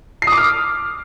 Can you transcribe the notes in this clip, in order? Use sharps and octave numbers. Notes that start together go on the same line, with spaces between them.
C7
D#6
D6
F6